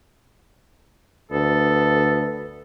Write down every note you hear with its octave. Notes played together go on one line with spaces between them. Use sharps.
D2 B3 A4